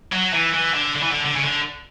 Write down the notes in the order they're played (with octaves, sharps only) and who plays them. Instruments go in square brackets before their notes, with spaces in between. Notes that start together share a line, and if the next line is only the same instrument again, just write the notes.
[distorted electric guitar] F#3
E3
E3
D3
D3
E3
D3
D3
C#3
D3